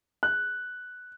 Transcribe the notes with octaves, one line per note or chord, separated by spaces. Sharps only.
F#6